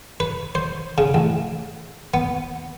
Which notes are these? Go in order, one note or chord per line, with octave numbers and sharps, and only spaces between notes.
B4
C5
C#3
A1
B3